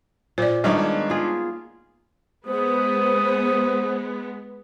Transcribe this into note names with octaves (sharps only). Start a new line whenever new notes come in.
A#2 C5 D5
D#3 G3 G#3 A#3 B3 D4 C#5
F4 G#4
G#3 B3 C5 D#6